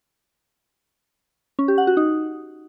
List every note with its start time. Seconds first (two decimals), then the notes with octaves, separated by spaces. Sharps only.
1.59 C#4
1.68 G4
1.78 F#5
1.87 F#4
1.97 D#4